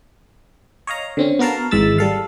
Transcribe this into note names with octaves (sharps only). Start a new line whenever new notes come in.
C#5 D#5 F5 A#5
D3 C4 C#4
B3 F#4 A#4 F5 A5
G#1 E3 G#3 E5 E6 A6
G3 A4 F5